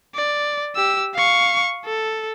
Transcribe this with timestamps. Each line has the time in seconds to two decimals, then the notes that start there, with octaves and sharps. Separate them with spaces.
0.15 D5
0.76 G4 E6
1.15 F5 C#6
1.85 A4